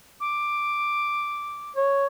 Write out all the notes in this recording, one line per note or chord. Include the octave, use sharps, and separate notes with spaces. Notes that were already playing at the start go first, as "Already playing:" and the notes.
D6
C#5